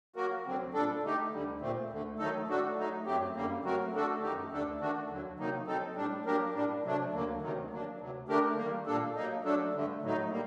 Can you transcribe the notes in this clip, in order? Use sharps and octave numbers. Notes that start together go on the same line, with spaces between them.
F#3 A#3 F#4 A#4
D2 D3 F#3 C4
A#2 G3 D4 A4
D3 A3 D#4 G4
D2 D3 G3
A#2 A3 C4
D2 D3 A3
D#3 F#3 A3 D#4 A4
A2 A3 D4 F#4 A4
F#3 A3 D#4
F#2 F#3 A3 C4 G4
F#2 D3 G3 A#3
F#3 A3 C4 F#4 A#4
D3 A3 D4 F#4 A4
F#2 D#3 A3 D#4 G4
D2 D3 A3 D4 A4
D#3 A3 D4 F#4
D#2 D3 F#3
C3 D#3 F#3 A#3 D#4
F#3 C4 D#4 A4
A2 G3 D4
F#3 A#3 D4 G4 A#4
A2 G3 A#3 D4
C3 F#3 A3 D4
D2 D3 F#3 A#3
D2 C3 D#3 F#3
F#3 A#3 D4
D2 C3 F#3
D3 A3 D4 G4 A#4
D#3 G3 A#3
A#2 G3 A#3 D4 A4
F#3 A#3 D#4
F#3 A3 D4 A4
G2 D3 A3
A2 F#3 A3 D#4
G3 A#3